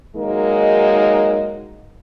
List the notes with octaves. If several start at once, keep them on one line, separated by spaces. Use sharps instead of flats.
D#3 F#3 G#3 A#3 D#4